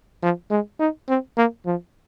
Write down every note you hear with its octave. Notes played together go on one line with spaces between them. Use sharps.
F3
G#3
D#4
C4
A#3
F3